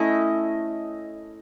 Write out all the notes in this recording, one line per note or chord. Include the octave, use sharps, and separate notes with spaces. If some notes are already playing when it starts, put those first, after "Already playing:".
Already playing: A3 C#4 E4 D#5